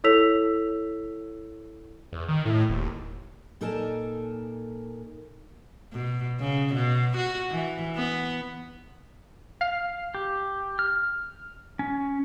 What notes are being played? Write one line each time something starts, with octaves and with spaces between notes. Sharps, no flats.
E4 A4 C#5 E6 B6 F7
E2
D#3
A2
D#1
A#2 D#4 A4 A#4 G#5 A5
B2
C#3
B2
F#4
E3
B3
F5
G4
F6
C#4